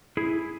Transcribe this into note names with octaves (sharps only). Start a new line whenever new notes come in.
E4 G#4